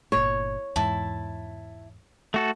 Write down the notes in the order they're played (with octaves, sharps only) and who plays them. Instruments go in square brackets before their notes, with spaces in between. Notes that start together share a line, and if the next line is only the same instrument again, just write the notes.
[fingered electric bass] G1 A#2 [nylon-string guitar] C#5
[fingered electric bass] E2 G#2 [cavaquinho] E4 A5
[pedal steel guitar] A3 F#4 A4